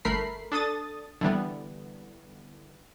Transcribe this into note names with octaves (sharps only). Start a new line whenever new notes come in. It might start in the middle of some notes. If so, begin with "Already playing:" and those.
G1 A3 A#4 B5 C7
D4 A4 D#6 A6
D3 E3 G3 B3